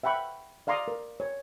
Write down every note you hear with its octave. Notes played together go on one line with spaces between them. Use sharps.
E5 F#5 G5 B5 C#6
D5 F5 A#5 C6 D6 D#6
A#4
C#5